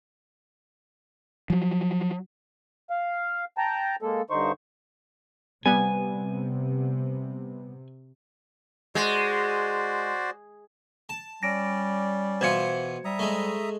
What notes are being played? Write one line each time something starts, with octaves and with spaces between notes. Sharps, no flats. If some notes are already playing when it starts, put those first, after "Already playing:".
F3 F#3
F5
G5 A5 A#5
G#3 A#3 A4
G2 D3 D#4 C5 C#6
C3 G3 B3 G#5
G#3 F#4 C5 D5
A5
G3 C#4 D5 A#6 D7
B2 E3 F4 C5 G#6 C#7
G3 E5 A#5 D#6
G#3 A3